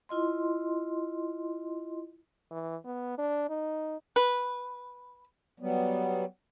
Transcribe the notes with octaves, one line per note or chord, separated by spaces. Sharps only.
E4 F4 D#5 C6
E3
B3
D4
D#4
B4
F#3 G3 B3